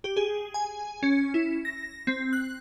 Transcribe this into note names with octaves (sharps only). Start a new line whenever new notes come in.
G4
G#4
G#5
C#4
E4
A#6
C4
F#6